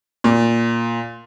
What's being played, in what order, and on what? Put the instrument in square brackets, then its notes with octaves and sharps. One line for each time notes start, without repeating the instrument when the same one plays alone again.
[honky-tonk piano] A#2